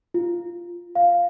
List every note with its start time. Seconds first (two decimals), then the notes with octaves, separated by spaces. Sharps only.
0.14 F4
0.95 F5